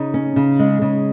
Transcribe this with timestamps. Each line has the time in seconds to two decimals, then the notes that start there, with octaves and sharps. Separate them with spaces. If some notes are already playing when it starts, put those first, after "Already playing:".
Already playing: C#3 D#4
0.14 C#4
0.36 C#3
0.59 G#3
0.82 C#3